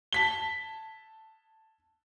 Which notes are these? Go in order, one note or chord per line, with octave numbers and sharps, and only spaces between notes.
A5 B6 G7